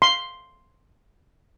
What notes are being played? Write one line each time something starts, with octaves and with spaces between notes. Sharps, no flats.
C6